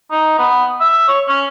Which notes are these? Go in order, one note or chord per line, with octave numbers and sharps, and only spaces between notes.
D#4
B3
E5
C#5
C#4